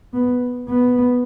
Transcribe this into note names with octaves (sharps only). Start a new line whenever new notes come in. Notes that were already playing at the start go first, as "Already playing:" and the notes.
B3
B3